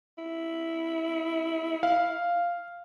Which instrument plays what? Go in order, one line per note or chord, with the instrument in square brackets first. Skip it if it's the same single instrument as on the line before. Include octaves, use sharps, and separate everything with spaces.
[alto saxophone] E4
[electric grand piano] F5